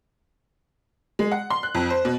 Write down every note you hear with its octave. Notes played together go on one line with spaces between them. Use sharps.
G#3
F#5
C6
F#6
F2
C5
B2